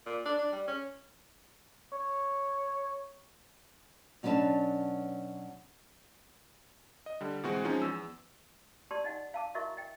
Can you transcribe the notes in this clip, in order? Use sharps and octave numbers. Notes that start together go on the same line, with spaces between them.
A#2
D4
D4
G3
C#4
C#5
B2 F#3 C#4 D4 B4 A5
D#5
D3 G3
B2 E3 G#3 C4 F#4
F3 G#3 C#4 D#4
E2 E6
G4 D5 A5 C6
D#4 D#5 F#5
F5 A5 D6
E4 F#4 A#4 D#5 E5 C#6
D#5 G5